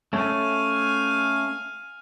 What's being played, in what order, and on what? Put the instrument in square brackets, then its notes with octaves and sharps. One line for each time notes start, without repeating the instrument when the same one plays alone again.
[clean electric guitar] A3 C#4 [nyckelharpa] F5 G#5